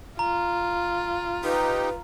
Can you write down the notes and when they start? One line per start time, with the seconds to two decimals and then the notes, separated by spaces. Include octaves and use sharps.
0.19 F4 A#5
1.44 D#4 G4 B4